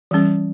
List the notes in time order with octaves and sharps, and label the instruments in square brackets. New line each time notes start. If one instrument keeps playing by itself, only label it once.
[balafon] E3 G3 C#4